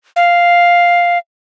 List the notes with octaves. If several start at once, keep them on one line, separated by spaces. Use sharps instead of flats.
F5